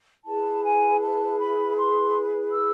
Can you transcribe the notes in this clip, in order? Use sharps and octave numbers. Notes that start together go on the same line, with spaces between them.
E4 G#4 B4 A5
G#5
A5
B5
C6
E6